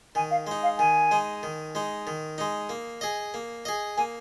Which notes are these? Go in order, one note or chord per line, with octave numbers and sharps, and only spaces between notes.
D#3 G#5
F5
G#3 D#4
F5
D#3 G#5
G#3 D#4
D#3
G#3 D#4
D#3
G#3 D#4
A#3
G#4 D#5
A#3
G#4 D#5
A#3 G#5